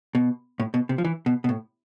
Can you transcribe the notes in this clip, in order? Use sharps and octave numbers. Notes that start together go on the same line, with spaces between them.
B2
A2
B2
C3
F3
E3
B2
B2
A2